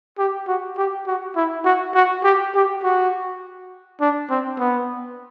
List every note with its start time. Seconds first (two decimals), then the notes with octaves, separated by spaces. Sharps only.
0.19 G4
0.48 F#4
0.78 G4
1.07 F#4
1.36 E4
1.65 F#4
1.95 F#4
2.24 G4
2.54 G4
2.83 F#4
4.01 D4
4.30 C4
4.59 B3